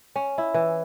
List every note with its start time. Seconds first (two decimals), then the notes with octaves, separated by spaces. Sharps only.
0.16 C#4
0.38 E4
0.54 E3